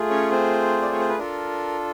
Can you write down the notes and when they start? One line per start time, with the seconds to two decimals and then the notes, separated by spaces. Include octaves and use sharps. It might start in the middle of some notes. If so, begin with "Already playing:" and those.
Already playing: A3 F4 G#4
0.10 C#4 C#5
0.31 C4 C5
0.82 D5
0.92 C#5
1.00 C5
1.09 B4
1.18 D4 F4 A4 A#4